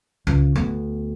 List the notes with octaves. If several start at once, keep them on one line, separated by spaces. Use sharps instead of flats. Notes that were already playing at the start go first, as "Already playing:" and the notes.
C#2
D2 B3